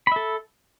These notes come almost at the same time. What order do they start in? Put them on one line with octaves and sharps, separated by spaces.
B5 E5 A4